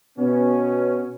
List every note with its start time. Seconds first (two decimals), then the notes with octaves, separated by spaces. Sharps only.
0.18 B2 B3 C#4